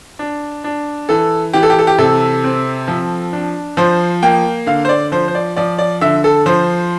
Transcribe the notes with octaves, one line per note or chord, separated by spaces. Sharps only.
D4
D4
E3 A4
E3 G4
A4
G4
A4
G4
C3 A4
C4
F3
D4
F3 C5
A#3 G5
D3 F5
C5
D5
F3 C5
C5
D5
F3 D5
D5
D3 E5
A4
F3 C5